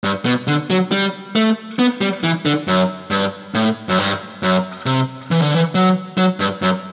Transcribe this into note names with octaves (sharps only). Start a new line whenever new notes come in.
G2
B2
D3
F#3
G3
A3
B3
G3
E3
D3
F#2
G2
A2
F#2
G2
F#2
C3
E3
D3
E3
F#3
F#3
G2
F#2